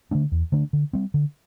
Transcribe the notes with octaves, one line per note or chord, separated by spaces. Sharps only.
D3 A3 D4
E2
D3 A3 D4
D3
G3 C4
D3